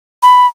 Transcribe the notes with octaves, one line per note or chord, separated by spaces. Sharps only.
B5